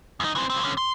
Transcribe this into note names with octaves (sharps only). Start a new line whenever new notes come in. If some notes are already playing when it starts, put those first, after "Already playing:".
E2 D#4
E3 C4
C#2 C4
D3 C#4
C6